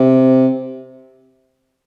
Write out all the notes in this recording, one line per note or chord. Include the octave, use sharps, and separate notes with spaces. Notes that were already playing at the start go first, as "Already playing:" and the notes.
Already playing: C3